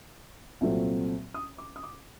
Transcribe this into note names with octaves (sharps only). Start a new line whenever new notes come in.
C2 A#2 F#3 A3 C4
D#6
D6
D#6
D6